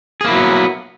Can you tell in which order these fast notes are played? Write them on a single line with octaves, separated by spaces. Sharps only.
G#4 A#3 E4 F#3 B3